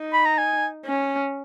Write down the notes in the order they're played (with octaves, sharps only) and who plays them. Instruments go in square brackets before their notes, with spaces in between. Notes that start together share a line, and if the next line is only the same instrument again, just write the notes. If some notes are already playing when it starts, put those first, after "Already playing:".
Already playing: [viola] D#4
[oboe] B5
A#5
G#5
[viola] C#4